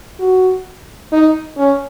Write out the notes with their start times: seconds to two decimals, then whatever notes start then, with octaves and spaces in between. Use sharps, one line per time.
0.20 F#4
1.12 D#4
1.57 C#4